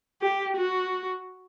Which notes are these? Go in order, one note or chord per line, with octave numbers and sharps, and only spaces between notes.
G4
F#4